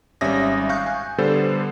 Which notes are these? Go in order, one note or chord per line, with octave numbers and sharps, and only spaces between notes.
G#1 G3 C#4 E5 D#6 A#6
F5 C#6 F#6 G6
G#5
D3 G3 B3 A4 C5